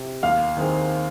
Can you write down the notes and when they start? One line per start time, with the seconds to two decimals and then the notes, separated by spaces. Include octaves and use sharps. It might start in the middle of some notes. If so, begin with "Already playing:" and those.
Already playing: C3
0.23 D#2 F5
0.57 D#3 C4 G#4 C5